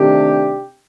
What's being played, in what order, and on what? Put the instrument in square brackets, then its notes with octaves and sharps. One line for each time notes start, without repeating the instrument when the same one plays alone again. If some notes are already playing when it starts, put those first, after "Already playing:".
Already playing: [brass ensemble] C3 D#3 A3 D4 G4